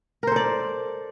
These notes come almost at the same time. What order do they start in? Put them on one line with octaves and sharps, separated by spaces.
A#4 C5 A4 D5